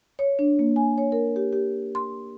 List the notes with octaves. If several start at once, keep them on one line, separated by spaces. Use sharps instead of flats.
C#5
D4
A#3
G#5
C#5
A#4
G4
G4
C6